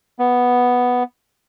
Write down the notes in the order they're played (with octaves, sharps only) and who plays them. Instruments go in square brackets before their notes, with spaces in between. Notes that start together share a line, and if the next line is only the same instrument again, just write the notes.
[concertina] B3